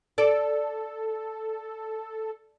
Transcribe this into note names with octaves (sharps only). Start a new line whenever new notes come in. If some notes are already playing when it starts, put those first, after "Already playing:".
A4 D5